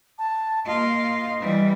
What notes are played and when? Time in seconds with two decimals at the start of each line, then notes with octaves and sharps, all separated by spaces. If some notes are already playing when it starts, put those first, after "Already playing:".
0.19 A5
0.66 A#3 F4 D#5
1.41 E3 G3